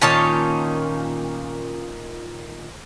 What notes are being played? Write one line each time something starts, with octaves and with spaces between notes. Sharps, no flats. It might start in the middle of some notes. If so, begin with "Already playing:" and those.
A#2 D#3 C#4 F4 C#5 A5